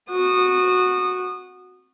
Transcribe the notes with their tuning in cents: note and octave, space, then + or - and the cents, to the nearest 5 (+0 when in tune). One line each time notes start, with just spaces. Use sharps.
F#4 -10 D#6 -25